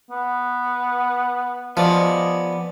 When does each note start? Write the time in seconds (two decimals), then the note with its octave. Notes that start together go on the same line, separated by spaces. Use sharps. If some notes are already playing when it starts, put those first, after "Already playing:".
0.11 B3
1.77 F3 B3 D5 D#5